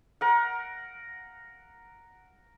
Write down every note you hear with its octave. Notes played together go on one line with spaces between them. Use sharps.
A#4 F#5